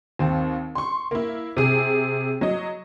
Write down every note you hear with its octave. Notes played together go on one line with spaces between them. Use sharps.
D#2 C4
C6 C#6
A#3 E4
C3 G#4
F#3 D#5